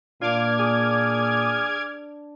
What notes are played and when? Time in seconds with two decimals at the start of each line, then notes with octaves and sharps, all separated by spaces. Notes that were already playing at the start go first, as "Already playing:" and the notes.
0.21 A#2 D4 F4 D6 F6 G#6
0.59 G#4